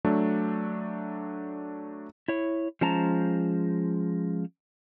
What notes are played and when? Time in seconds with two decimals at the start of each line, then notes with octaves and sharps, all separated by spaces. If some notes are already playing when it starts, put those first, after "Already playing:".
0.05 F#3 A3 D4
2.28 E4 C#5
2.81 F3 G#3 C#4 C5 A5 A#5